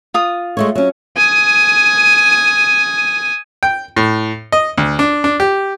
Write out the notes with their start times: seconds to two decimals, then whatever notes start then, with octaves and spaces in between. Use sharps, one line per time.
0.14 F4 D#6
0.57 G#3 A3 C#5
0.75 F#3 C#4
1.17 G#5 D#6
3.63 G5
3.96 A2
4.52 D#5
4.77 D2
4.99 D4
5.24 D4
5.40 G4